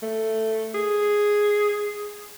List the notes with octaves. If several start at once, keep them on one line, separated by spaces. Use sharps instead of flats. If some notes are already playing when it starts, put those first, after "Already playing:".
A3
G#4